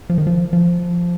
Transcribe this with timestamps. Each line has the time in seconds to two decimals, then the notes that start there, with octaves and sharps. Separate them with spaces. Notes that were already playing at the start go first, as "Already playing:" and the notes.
0.10 F3
0.18 D#3
0.27 F3
0.53 F3